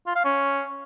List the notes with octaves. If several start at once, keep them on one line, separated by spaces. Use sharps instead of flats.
F4
F5
C#4